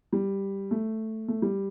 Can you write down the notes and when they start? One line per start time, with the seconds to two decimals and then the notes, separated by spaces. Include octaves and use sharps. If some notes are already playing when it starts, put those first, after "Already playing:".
0.13 G3
0.71 A3
1.28 A3
1.42 G3